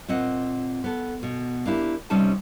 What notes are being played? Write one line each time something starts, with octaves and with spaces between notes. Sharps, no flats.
A#2 C4 D#5 F#5
B3 A4
B2
A#3 D4 E4 G4
C3 G3 C#4 D#4 A5